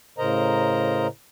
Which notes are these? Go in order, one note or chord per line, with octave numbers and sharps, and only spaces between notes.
A2 C#3 A#4 C5 D#5 A#5